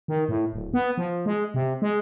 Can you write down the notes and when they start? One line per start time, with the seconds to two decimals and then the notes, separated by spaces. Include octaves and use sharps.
0.08 D#3
0.29 A2
0.53 D1
0.74 B3
0.97 F3
1.26 G#3
1.54 C3
1.82 G#3